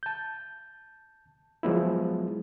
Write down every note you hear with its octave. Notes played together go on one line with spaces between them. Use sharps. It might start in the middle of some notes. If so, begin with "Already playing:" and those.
A5 G6
F3 F#3 G#3 B3 E4